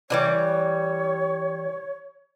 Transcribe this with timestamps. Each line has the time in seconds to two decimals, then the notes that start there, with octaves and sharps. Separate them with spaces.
0.10 D3 E3 G3 C#5